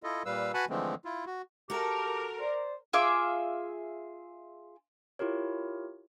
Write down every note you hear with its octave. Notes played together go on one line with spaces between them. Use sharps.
E4 F4 A4 D#5
A#2 G3 B4 F5 E6
F#4 B4 F#5 G#5 A5 B5
D3 E3 F3 G#3 A3 C4
E4 F4
F#4
F#4 G4 A4 A#4
C5 D5
F4 G#4 E5 D6
E4 F4 G4 A#4 C#5